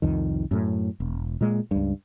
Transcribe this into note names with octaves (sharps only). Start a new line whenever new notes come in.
C2 F2 D#3
F#2 A2
E1
A#2 G#3
C#2 G2